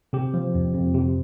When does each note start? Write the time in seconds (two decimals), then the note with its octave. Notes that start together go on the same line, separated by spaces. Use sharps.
0.13 C3 G4
0.34 F3
0.55 F2
0.75 F2
0.94 C3